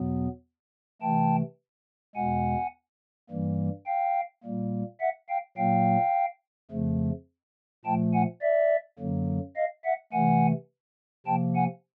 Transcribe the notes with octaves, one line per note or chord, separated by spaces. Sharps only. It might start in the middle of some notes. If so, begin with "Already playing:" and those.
Already playing: E2 B2 F#3 B3
C3 E3 A3 G5 A5
E2 B2 G#3 F#5 G#5
G2 E3 G3 A#3
F5 G5
A#2 G3 A#3
E5 F#5
F5 G5
A#2 F#3 A#3 F5 G5
F2 C#3 F3 A3
A#2 F3 A3 G5 A5
F#5 G#5
D5 E5
F#2 D3 F#3 A#3
D#5 F5
E5 F#5
C3 E3 A3 F#5 G#5
C3 F3 A#3 G5 A5
F#5 G#5